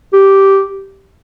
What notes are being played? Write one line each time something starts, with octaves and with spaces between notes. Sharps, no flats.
G4